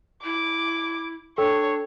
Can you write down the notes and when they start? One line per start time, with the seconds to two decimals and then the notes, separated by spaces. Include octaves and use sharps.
0.24 E4 D6
1.38 D4 A4 C#5 G5 E6